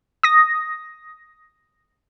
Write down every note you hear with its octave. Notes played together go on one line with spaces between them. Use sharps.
D#6 A#6